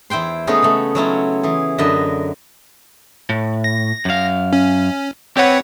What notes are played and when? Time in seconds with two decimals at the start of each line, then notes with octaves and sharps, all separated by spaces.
0.10 E2 E4 C5 G5 C6
0.47 G#3 A3 B3 C#4 D#4 G#4
0.62 C#3 A3
0.95 F#3 C#4 E4 F4
1.43 E3 G#4
1.78 F#2 D3 B4 D#5 E5
3.29 A2
3.64 A#6
4.05 F#2 F5
4.53 C#4
5.37 C4 G4 B4 C#5 F#5